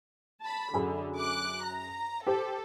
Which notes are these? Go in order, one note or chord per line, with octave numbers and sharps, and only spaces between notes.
A5 B5
F#2 D3 G#4 B5
D6 F#6
A#5
G4 A4 C5